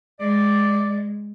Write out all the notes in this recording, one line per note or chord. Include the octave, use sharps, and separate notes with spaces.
G#3 D5